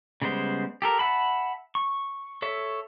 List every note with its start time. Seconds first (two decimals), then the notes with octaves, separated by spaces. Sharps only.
0.22 C#3 G3 G#3 B3 C5
0.82 G4 A4 A#4
0.99 E5 F#5 A5 B5
1.75 C#6
2.42 A4 C#5 E5